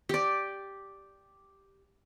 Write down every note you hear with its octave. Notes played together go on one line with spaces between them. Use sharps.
G4 D5